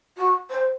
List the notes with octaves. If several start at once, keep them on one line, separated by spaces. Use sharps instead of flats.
F#4
C5